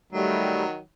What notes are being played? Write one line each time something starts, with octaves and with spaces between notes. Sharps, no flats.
D#3 F#3 G3 A3